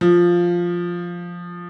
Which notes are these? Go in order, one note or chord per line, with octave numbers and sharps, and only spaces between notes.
F3